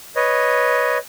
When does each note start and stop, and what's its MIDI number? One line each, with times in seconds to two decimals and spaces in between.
0.16 0.98 71
0.16 0.98 73
0.16 0.98 75